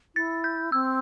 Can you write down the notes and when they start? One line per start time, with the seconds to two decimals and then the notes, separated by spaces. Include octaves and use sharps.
0.15 E4 A6
0.44 G6
0.72 C4 E6